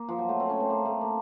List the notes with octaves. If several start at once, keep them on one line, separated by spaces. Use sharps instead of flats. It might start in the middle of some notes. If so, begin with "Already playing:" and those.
Already playing: A#3
F3
F#3
A3
C4
C#4
C4
A#3
A3
A#3